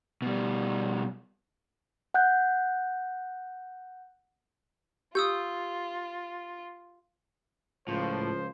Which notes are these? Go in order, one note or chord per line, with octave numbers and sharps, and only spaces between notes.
B2 G3
F#5 F#6 G6
F4 G4 D#6 E6 G6
C#2 A2 F3 C5